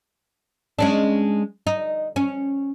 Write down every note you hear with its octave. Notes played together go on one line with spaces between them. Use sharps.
G#3 C#4 D4
D#4
C#4